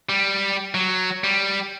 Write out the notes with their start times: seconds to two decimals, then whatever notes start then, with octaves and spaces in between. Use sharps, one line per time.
0.09 G3
0.74 F#3
1.24 G3